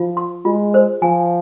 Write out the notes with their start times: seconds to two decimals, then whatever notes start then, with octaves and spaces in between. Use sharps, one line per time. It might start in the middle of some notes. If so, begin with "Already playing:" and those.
Already playing: F3 F4
0.17 C6
0.45 G#3 F4
0.74 C5
1.02 F3 G#5